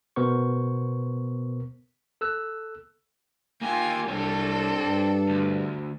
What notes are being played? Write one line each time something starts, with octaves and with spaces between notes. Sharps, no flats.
B2 B3 A#4 C5 C#6
A4 E6 F#6
A#3 F4 G4 G#5
C2 C4 D4 A4 C#5
G2
D2